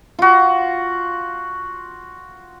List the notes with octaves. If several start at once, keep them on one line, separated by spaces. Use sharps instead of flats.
F4 F#4